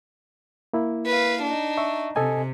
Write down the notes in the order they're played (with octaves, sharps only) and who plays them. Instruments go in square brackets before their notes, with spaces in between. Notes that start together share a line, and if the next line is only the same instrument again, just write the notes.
[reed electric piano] A#3 E4
[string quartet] B4 F5
D4 D#4
[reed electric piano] E5 C#6
[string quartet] C3 [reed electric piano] A4 D#5 G#5